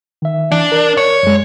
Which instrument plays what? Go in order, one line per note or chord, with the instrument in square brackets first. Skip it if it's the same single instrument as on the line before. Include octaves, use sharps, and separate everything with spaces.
[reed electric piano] D#3 E5
[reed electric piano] E3 [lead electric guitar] D4
[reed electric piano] A#4 D5
[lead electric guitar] C#5
[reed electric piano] F#2 G#3